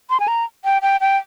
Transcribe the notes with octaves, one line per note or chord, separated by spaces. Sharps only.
C6
G#5
A#5
G5
G5
G5